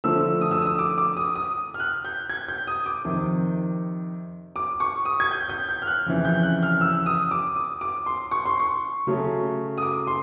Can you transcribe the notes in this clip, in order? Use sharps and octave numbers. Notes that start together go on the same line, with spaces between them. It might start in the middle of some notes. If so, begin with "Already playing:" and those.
D3 F3 A3 E6
D#6
E6
D#6
D6
D6
D#6
D#6
F6
F#6
G6
G#6
G6
D#6
D6
F2 C3 D#3
D6
C#6
D#6
G#6
G6
G6
G6
F6
F#6
F2 C#3 E3
G6
F#6
F6
E6
D#6
D6
D#6
D6
C6
C#6
C6
C#6
C#3 F#3 A3 C#4
D#6
D6
C6